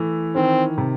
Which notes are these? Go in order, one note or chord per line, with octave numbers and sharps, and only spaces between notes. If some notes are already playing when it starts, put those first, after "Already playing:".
Already playing: E3 A3
D#3 C4
C3